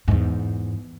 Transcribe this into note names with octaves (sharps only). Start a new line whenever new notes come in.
E2 G#2